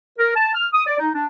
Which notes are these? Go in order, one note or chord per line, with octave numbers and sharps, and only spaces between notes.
A#4
A5
F6
D#6
D5
D#4
D4